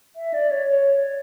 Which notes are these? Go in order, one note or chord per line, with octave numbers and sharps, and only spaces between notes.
E5
D5
C#5
C#5